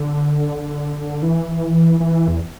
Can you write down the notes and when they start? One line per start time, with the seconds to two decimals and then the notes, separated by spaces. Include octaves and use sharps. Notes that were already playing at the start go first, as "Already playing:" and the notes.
Already playing: D3
1.22 E3
2.00 E3
2.28 E2